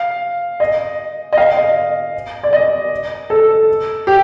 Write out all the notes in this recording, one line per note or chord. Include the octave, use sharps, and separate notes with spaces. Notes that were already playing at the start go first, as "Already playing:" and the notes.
Already playing: F5
D#5
D#5
F5
D#5
D5
D#5
A4
G4